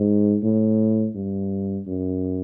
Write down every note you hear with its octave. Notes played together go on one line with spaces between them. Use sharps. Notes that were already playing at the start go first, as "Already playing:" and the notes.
Already playing: G#2
A2
G2
F#2